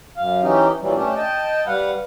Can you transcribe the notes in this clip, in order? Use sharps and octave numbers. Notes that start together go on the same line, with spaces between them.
F#2 F5
E3 C#4 D#4 G4
A#2 E3 F#3 G3
A3 C#4 D4 G4
D#5 G5 A5
G3 B4 F5 F#5